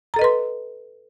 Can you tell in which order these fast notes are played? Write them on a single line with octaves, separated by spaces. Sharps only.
A#5 A4 D#5 B4 C6